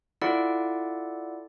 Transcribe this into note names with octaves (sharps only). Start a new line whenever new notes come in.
E4 F4 A4 D5 F#5